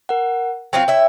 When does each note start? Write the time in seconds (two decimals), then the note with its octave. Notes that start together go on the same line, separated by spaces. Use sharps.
0.09 A#4 F#5
0.73 F#3 C4 F4 G5
0.88 E4 C#5 E5